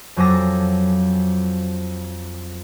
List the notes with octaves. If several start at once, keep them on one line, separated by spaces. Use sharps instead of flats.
F2 F#3 G#4 A4 D6 A#6